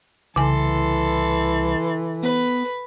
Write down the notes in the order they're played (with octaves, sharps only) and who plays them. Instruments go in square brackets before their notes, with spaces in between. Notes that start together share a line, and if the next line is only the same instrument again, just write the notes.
[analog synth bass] C2 [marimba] C#3 G#5 [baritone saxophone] E3 [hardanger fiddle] A4 C6
[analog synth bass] B3 [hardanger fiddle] B4